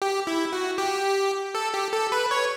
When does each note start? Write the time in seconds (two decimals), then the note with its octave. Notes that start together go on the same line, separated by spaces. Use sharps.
0.02 G4
0.27 E4
0.53 F#4
0.78 G4
1.55 A4
1.74 G4
1.93 A4
2.12 B4
2.31 C#5